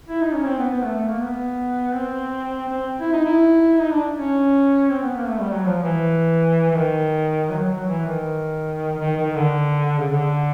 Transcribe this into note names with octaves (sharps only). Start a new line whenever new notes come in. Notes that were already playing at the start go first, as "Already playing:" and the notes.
E4
D#4
C#4
C4
B3
B3
A3
A3
A#3
B3
C4
C4
E4
D#4
E4
D#4
D4
C#4
C4
B3
A#3
A3
G3
F#3
F3
E3
E3
D#3
F#3
F#3
E3
D#3
D#3
D#3
D3
C#3
D3